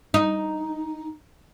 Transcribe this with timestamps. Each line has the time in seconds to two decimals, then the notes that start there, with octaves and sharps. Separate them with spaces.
0.14 D#4